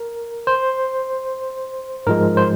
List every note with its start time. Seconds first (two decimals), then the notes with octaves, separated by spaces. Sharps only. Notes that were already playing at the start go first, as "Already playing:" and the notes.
Already playing: A#4
0.47 C5
2.07 G#2 F3 G#3 A#4
2.37 C5